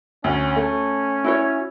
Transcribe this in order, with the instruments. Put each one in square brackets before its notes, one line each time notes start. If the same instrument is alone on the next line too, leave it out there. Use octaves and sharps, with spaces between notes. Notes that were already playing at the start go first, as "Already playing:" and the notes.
[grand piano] D2 [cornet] C#4
[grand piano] A3
[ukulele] E4 F#4 C#5